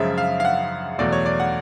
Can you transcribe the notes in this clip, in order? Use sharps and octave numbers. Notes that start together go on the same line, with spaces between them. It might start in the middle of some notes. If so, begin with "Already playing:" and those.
Already playing: F#2 C#3 F3 G#3 E5
F5
F5
F#5
E2 B2 F#3 A3 D5
C#5
D5
F#5